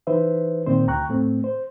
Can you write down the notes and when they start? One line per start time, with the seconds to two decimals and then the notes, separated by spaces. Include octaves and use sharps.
0.07 E3 D#4 B4 C5 E5
0.67 A#2 D#3 C4 C5
0.87 D2 G5 A#5 C#6 F#6
1.09 A2 A3 C4
1.44 C5